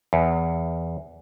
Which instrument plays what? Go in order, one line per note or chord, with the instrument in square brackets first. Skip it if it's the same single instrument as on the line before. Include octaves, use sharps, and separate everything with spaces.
[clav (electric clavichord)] E2